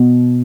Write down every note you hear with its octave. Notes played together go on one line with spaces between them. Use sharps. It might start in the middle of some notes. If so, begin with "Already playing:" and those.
Already playing: B2